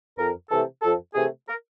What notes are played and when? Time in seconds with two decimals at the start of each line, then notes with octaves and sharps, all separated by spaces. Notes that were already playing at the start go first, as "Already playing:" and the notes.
0.17 F2 A#4
0.50 C3 E3 A3 A4
0.82 F2 A4
1.14 C3 E3 A3 G#4
1.48 A#4